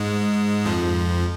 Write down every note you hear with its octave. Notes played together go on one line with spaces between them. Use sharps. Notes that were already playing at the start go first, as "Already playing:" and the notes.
Already playing: G#2 G#3
F2 F3